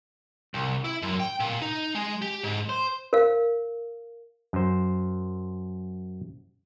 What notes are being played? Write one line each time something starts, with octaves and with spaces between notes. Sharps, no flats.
C2
E4
F#2
G5
A#2
D#4
G#3
G4
G#2
C5
A#4 F5
F#2 C5